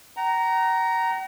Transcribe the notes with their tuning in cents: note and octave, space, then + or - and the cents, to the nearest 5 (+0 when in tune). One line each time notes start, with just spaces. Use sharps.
F#5 +45 A#5 +0